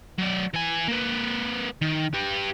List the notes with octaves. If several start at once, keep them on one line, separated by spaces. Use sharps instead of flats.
F#3 D5
E3 G#5
A#3 B4
D#3
G4 B4